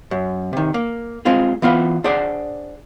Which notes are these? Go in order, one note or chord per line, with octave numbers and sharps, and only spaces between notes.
F#2
C3 D#3
A#3
G#3 C4 F4 G#4
E3 B3 F4 F5
D4 G#4 C5 D5 F#5